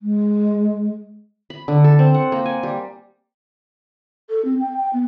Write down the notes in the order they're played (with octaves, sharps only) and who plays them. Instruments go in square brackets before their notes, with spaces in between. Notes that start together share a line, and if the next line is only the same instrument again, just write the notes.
[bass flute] G#3
[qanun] B5
D3
A4
C4
F#5
A#3
G#5
G3
[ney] A4
C4
G5
G5
B3